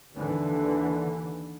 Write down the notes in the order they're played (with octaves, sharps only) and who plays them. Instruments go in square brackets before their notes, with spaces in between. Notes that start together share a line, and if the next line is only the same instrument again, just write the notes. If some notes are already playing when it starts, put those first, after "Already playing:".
[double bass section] D#2 D3 E3